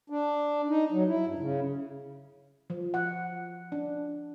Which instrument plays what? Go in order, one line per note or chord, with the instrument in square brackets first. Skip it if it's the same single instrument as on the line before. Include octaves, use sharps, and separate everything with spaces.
[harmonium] D4
D#4
F#3
E4
G2
C#3
[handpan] F3
F#5
D4